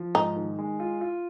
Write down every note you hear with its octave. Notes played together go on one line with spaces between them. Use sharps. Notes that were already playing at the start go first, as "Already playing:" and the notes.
Already playing: F3
G#2 D#4
D#3
G#3
F4
F4